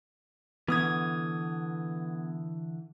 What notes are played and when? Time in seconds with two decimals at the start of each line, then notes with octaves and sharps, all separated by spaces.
0.68 D3 E3 B3 D#6 G#6